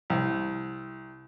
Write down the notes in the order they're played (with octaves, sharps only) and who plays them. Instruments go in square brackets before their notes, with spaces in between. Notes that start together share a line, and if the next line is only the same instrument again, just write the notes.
[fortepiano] C2